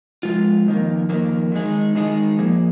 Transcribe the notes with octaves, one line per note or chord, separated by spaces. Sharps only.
F2 D#3 G#3 F4
F2 D#3 A#3
F2 D#3 A#3
D#3 G#3 D#4 G#4
D#3 G#3 D#4 G#4
F3 A#3 G#4